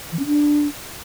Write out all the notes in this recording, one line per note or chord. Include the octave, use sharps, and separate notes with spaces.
E3
C#4
D4